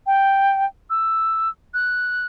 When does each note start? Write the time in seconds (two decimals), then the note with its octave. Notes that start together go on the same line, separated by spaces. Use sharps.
0.06 G5
0.90 E6
1.74 F#6